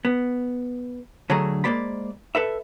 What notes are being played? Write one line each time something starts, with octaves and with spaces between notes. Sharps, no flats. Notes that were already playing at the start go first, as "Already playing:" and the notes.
B3
D3 F#3 A3 D4 G#4 A#5
G#3 A#3 C5 D5 B5
A4 B4 E5